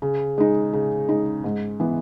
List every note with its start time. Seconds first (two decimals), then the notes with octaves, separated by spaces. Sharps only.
0.02 C#3
0.38 G#3 D#4
0.73 C#3
1.09 G#3 D#4
1.44 G#2
1.80 E3 B3